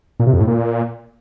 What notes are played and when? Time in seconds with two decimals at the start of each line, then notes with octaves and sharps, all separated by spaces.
0.20 A#2
0.27 C3
0.34 F2
0.41 A2
0.47 A#2